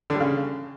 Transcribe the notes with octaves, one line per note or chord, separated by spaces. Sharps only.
D3
G3
C#3